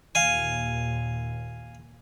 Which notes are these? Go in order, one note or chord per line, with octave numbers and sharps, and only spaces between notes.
D#2 A#2 F5 G#5